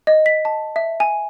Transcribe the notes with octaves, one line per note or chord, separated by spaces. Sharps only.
D#5
B6
A5
E5
G#5